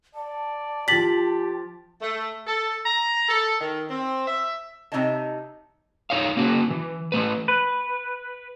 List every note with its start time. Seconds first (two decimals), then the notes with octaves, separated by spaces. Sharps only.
0.15 D5 A5
0.88 F3 G4 A6 B6 F#7
2.02 A3
2.47 A4
2.85 A#5
3.29 A4
3.61 D#3
3.90 C4
4.27 E5
4.92 C3 C4 D#4 C#5 D#5 A5
6.10 D#4 C#5 F5
6.37 A#3 C#4 F#4
6.70 E3
7.12 E3 A3 B4
7.48 B4